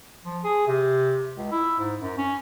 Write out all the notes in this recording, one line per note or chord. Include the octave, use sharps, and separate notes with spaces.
F3
G#4
C3
C#2
E4
G#2
F#2
C#4